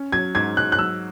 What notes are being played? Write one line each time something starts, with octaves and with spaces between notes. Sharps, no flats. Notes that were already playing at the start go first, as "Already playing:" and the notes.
Already playing: C#4
F#3 G#6
G#2 G#6
G#2 F#6
F#6
F#3 E6